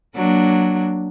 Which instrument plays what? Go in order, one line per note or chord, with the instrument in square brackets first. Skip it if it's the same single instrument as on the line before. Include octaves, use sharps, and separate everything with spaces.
[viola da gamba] F#3 A#3 D4